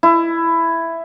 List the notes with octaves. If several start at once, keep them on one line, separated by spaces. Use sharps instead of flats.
E4